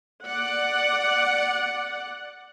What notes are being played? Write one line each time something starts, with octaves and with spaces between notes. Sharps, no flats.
D5 F#5